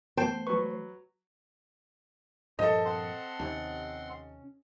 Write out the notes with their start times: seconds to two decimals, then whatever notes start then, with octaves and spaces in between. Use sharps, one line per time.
0.17 E3 A3 B3 C5 G5 A5
0.47 F#3 B4 C#6
2.59 G2 A#2 F3 A4 C5 D#5 A5
2.85 C4 F#5 C6
3.40 D#2 C3 C#4